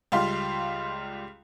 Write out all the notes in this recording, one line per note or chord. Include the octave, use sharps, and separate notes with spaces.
C#2 G3 F4 F5 C6